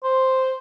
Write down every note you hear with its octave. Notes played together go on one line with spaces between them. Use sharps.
C5